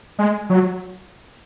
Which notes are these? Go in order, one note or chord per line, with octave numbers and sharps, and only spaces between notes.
G#3
F#3